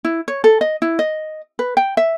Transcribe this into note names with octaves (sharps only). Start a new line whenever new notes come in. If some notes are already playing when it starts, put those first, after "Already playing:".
E4
C#5
A4
D#5
E4
D#5
B4
G5
E5